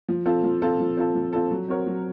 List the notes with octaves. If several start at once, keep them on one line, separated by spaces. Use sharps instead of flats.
F3
C4 F4 A4
F3
C4 F4 A4
F3
C4 F4 A4
F3
C4 F4 A4
F#3
C4 F#4 A#4 C#5
F#3